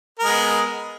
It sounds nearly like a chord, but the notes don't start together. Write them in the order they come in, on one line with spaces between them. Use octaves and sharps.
A#4 G#3 B3